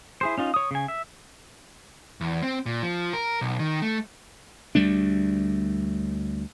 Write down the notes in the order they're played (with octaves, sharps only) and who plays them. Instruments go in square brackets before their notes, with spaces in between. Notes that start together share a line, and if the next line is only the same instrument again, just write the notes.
[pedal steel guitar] E4 G#4 C5
C#4 D#4 F4
C#5 D#6
C#3 G#5
E5
[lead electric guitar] E2
C4
A#2
F3
A#4
B1
D#3
A3
[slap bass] D2 G3 A3 D4